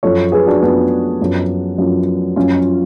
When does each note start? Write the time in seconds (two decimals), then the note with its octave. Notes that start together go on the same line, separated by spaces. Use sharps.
0.03 F#2 F3 A4 C#5
0.32 G#4 B4
0.47 D4 F#4
0.62 F#2 F3 B3 D4
1.21 F#2 F3
1.78 F#2 F3
2.36 F#2 F3 C#4 F4